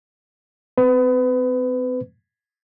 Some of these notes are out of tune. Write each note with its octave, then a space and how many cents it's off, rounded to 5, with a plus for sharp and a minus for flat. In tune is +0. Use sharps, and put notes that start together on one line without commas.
C4 -35 B4 +30